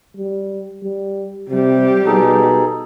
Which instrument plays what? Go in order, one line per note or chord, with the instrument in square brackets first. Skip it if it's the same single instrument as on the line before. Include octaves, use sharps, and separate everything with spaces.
[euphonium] G3
G3
[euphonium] C3 [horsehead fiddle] G3 G4
[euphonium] B2 [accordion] D#4 G#4 A4